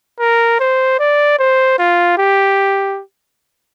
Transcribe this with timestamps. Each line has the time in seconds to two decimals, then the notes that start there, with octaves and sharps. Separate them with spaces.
0.20 A#4
0.60 C5
1.00 D5
1.39 C5
1.79 F4
2.18 G4